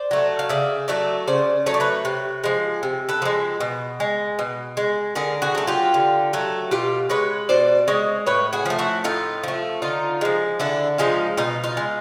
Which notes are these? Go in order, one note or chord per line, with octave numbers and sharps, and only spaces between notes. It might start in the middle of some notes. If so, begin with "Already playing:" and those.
Already playing: C5 D5
F#3 A3
F5
C#3 D5 E5
F#3 A3 D5 E5
C#3 C5 D5
F#3 A3 C#5
D5
B4 C#5
C3
F3 G#3
C3
A4 B4
F3 G#3
B2
G#3
B2
G#3
D3 G#4 A#4
F#4 G#4
F#3 A3
F4 G4
D3
F#3 A3
B2 F4 G4
G#3 B4 C#5
B2 C5 D5
G#3 C#5 D#5
A2 B4 C#5
F#4 G#4
F3 A3
E4 F#4
A2 D#4 F4
F3 A3
D3 D#4 F4
F3 G#3
D3 D4 E4
F3 G#3 D#4 F4
B2 D#4 F4
D#4 F4
G#3